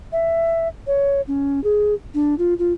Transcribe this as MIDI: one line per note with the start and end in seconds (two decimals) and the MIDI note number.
0.12 0.68 76
0.87 1.21 73
1.28 1.62 61
1.64 1.94 68
2.14 2.35 62
2.38 2.54 65
2.59 2.73 65